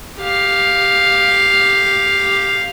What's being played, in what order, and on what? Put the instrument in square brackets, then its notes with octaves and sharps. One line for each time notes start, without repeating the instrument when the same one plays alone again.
[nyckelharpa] G4 F5